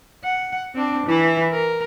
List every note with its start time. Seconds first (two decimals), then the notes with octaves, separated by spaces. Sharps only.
0.24 F#5
0.75 C4 D4
1.06 E3 E4
1.52 A#4